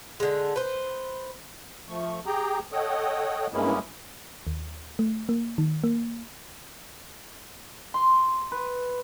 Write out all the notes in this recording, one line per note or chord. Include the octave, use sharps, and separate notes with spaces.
D3 G#3
B4 C5
F3 A3 C#6
G4 G#4 G5 A#5
A4 C#5 D#5 F#5 G5 D#6
G2 G#3 A#3 B3 C#4 E4
D#2
A3
A#3
D#3
A#3
C6
B4